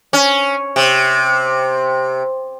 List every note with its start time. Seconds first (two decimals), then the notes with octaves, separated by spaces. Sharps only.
0.13 C#4
0.76 C3